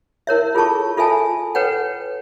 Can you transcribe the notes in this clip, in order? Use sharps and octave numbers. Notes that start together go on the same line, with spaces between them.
E4 A#4 C#5 E5
F4 G#4 A4 A5 C#6
F4 A4 E5 G#5 A5
A4 B4 C#5 F#5 G5